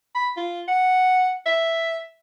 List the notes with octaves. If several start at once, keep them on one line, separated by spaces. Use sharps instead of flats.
B5
F4
F#5
E5